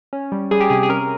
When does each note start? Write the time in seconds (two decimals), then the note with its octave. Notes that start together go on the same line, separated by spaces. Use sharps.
0.13 C#4
0.32 G3
0.51 G3 G#4
0.60 G4
0.70 C3 G#4
0.83 G#4
0.89 C#4 A#4